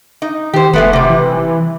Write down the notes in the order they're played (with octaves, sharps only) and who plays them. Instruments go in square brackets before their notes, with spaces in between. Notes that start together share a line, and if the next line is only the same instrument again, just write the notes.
[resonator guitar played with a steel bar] D#4
[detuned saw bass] D#3 [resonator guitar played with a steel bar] G4 C5
[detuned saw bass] F1 [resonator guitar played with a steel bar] G#3 A3 B3
[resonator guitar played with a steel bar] C3 G3
[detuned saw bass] E3